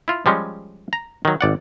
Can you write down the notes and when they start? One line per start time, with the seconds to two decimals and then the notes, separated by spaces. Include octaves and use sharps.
0.08 E4 F4
0.26 F3 G3 G#3 C#4
0.93 A#5
1.25 D#3 F#3
1.41 G#1 D5 F#5